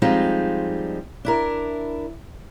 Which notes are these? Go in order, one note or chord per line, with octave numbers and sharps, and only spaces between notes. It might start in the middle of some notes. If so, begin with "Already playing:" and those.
F3 G3 G#3 C4 D#4 F4
D4 E4 A#4